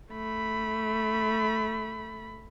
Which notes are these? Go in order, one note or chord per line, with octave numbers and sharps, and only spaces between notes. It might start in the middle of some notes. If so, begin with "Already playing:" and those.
A3 B5